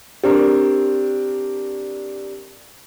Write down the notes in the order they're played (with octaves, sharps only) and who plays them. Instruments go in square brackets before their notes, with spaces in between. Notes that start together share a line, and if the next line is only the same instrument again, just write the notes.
[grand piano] C4 D4 A#4 [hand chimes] G4